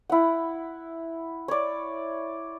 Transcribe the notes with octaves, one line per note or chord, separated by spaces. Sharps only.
E4 F#5
C#5 D5